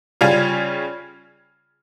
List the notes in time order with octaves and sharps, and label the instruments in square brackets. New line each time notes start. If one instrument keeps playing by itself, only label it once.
[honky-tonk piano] C#3 G3 C#4 F4 G#6